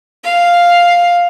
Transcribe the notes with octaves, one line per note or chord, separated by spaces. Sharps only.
F5